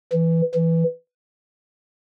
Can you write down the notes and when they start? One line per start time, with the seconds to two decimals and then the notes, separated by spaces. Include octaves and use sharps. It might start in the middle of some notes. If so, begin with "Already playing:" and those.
0.12 E3
0.54 E3